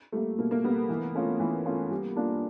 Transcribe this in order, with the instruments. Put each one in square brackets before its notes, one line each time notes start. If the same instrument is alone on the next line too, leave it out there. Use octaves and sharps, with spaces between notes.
[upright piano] G3 A#3 [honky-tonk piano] A3
[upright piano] B2 [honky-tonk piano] A#3
[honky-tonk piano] A#3
[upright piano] G3 [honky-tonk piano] B3
[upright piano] A#3
E3
A3 C#4 F4
E3
A3 C#4 F4
G3
A#3 D4 F4